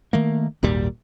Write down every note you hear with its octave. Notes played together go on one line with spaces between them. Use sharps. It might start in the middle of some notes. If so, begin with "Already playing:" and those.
D#3 A3 A#3
G#1 D#2 A#2 G3